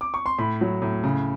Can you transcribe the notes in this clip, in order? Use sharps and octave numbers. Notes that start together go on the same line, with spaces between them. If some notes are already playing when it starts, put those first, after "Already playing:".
D6
C#6
C6
A2 B5
F#3
A2
C#3